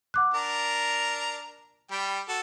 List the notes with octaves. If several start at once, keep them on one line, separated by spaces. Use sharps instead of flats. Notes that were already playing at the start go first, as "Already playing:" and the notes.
F#5 D6 F#6
D4 A#4 A#5
G3 G5 B5
F#4 A4